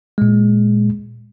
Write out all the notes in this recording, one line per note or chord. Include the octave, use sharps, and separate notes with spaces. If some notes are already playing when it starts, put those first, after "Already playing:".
A#2 G#3